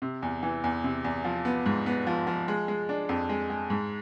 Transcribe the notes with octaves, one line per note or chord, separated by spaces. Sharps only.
C3
E2
E3
E2
C3
E2
F3
B3
G#2
B3
F3
F3
G#3
G#3
D4
F2
G#3
G#3
G#2